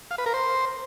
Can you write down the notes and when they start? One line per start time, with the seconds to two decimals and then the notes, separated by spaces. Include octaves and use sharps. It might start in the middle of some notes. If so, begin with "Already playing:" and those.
0.11 F5
0.18 B4
0.26 A#4
0.34 C5